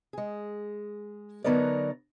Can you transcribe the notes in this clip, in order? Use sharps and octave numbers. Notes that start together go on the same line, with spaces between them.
G#3 G#4
D3 F#3 B3 D#4 A#4 D5